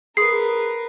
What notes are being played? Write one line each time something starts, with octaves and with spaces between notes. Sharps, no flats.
G#4 A#4 B4 C6 D#6 C7